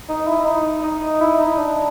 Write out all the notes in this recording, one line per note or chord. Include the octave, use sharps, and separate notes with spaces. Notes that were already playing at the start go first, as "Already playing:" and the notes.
D#4
E4
D#4
D#4
E4
D#4
D4